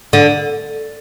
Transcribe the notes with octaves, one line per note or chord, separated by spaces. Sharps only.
D3